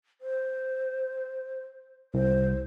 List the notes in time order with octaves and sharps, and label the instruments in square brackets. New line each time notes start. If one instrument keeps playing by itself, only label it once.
[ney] C5
[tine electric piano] C2 [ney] C5